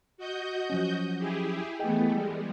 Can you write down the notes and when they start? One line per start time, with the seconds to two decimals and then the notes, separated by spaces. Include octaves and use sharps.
0.17 F#4 D#5 G6
0.70 F3 F#3 C#4
1.19 E4 G4 G#4
1.79 E3 A3 B3 G#4 D#5 G5
2.11 G3 G#3